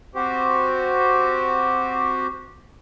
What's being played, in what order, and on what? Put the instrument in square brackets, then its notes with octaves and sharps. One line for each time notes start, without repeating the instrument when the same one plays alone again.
[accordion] C4 F#4 G4 C5